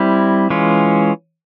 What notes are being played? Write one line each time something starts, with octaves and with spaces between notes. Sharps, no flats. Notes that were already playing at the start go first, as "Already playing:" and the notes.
Already playing: G3 C4 E4
E3 G#3 C#4 F4